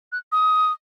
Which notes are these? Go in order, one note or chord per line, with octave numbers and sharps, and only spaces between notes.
F#6
D#6